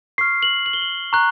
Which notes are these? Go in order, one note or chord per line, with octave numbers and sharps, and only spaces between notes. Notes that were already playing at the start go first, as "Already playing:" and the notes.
C#6 F6 C7
F#7
F#7
G7
F#7
A#5 C#6 F#6